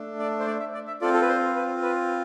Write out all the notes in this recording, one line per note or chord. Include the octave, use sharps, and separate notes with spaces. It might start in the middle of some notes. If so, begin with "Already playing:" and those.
Already playing: A3 D4
D5
C5
D5
E5
D5
E5
C4 F4 A4 D5
A4
B4
C5
B4
B4